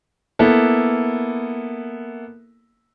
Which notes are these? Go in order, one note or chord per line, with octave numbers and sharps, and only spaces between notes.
A#3 B3 E4 A4